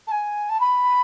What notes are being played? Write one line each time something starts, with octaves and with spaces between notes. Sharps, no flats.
A5
G#5
A5
B5